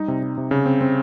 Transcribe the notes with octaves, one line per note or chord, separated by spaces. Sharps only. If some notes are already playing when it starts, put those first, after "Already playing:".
Already playing: G3 D#4
C3
D#4
C3
C#3
C4
C4